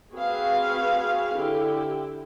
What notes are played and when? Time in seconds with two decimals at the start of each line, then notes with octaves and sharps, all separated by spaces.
0.13 C4 F#4 G#4 B4 F5
1.36 D3 E4 G4